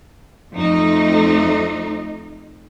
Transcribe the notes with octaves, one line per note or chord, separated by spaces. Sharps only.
F2 A3 D#4